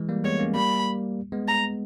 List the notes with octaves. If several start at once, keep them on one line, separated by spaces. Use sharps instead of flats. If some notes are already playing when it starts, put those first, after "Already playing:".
Already playing: E3 G#3
G3 A#3
G#3 B3 C#5
A#3 C#4
G3 A#3 B5
G#3 B3
A#5